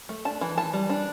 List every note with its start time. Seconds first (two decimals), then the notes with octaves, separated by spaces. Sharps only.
0.09 A3
0.25 D4 A5
0.41 E3
0.57 E3 A5
0.73 G3
0.90 D4